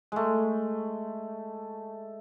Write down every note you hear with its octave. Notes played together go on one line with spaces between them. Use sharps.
G#3 A3